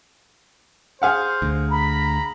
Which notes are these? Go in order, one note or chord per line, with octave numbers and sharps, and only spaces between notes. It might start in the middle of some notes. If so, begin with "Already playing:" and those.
G#4 C5 F5 F#5
D2
A#5 B5